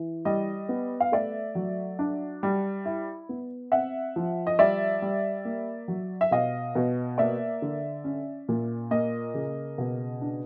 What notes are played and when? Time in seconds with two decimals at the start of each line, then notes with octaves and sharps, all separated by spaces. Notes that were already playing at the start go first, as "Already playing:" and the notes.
Already playing: E3
0.25 G3 D#5
0.69 B3
1.00 F5
1.12 A3 D5 E5
1.55 F#3
1.99 D4
2.43 G3
2.86 E4
3.29 B3
3.72 C4 E5 F#5
4.16 F3
4.47 D#5
4.59 G3 D5 E5
5.02 G3
5.45 A#3
5.88 F#3
6.21 E5
6.31 B2 D#5 F5
6.75 B2
7.18 A#3 D5 E5
7.62 D3
8.04 C#4
8.49 A#2
8.91 A#3 D#5
9.34 C#3
9.78 B2
10.22 D4